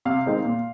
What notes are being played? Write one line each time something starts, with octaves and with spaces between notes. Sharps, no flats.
C3 F5
D#3 G#3 C4
A#2